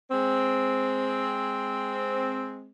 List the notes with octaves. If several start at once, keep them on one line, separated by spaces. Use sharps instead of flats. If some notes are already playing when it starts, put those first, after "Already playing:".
G#3 C4